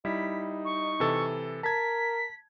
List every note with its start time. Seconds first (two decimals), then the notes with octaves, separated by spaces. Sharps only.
0.05 G3 D#4 E4 B6
0.64 C#6
1.00 C3 E3 A4
1.63 A#4 A5 G#6 B6